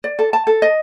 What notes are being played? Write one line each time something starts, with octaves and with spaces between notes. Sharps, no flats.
D5
A4
A5
A4
D#5